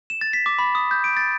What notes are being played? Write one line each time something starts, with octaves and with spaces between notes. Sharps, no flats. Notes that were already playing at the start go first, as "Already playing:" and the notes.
E7
A6
B6
D6
B5
D#6
G6
D7
A6